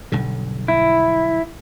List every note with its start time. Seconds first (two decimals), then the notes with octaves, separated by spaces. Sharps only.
0.12 B1 G2 D3
0.68 E4